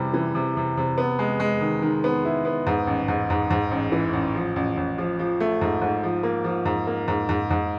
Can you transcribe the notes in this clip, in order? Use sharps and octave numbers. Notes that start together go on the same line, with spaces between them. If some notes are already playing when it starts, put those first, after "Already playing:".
Already playing: C3 E3 G3
E3
C3
C3
C3
B3
G#3
G#3
D#3
D#3
B3
E4
B3
G#2
A1
G#2
G#2
G#2
A1
E3
A1
F3
A1
A1
F3
F3
A3
G#2
G#2
F3
A#3
F3
G#2
A#3
G#2
G#2
G#2